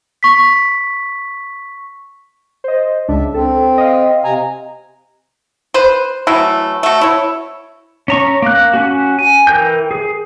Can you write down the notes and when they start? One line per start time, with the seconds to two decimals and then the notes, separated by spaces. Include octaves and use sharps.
0.23 C#6 B6
2.64 C5 D#5
3.08 C#2 D4 E5
3.34 C4 A4
3.78 D#5 F5
4.24 C3 G#5 A#5
5.74 B4 C5
6.27 E3 F#3 A3 E4
6.83 A3 F#4
7.01 E4 C#5
8.08 C#4 A#5 C#6
8.42 A#3 F#6
8.74 C#4 F#4
9.19 G#5
9.47 E3 A#4 G5 G6
9.91 G#4